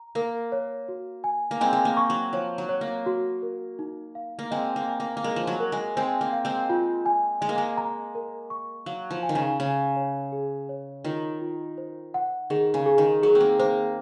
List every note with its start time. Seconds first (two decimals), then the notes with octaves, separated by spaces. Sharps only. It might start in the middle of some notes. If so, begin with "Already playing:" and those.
Already playing: A#5
0.15 A#3 A#4
0.52 C#5
0.89 F#4
1.24 G#5
1.51 A#3
1.60 G#3 C4 G#5
1.73 G#3
1.85 A#3
1.97 C#6
2.10 F#3
2.33 F3 C#5
2.58 F#3
2.69 C#5
2.81 A#3
3.06 F#4
3.42 A#4
3.79 D#4
4.15 F5
4.39 A#3
4.51 G#3 C4 D#5
4.76 A#3
4.88 G#5
5.00 A#3
5.17 A#3
5.24 G#3 A#4
5.36 F3
5.47 F#3
5.60 A#4
5.72 G#3
5.96 G#3 C4 C5
6.21 A#3
6.33 F5
6.45 G#3 C4
6.70 F4
7.06 G#5
7.41 G#3 D#5
7.49 A#3
7.58 G#3
7.77 A#5
8.15 A#4
8.50 C#6
8.86 F#3 F5
9.11 F3
9.23 G#5
9.29 D#3
9.35 C#3
9.60 C#3 C#5
9.96 C#5
10.32 G#4
10.69 C#5
11.04 D#3 F4
11.41 F4
11.78 C5
12.14 F#5
12.50 D#3 G#4
12.74 C#3
12.86 G#4
12.98 D#3
13.23 F#3 G#4
13.35 C4
13.40 A#3
13.59 A#3 C5